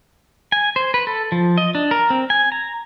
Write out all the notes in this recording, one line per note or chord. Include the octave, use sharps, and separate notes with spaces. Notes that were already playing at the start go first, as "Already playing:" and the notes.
G#5
C5
B4
A4
F3
D#5
D4
A#4
C4
G#5
A#5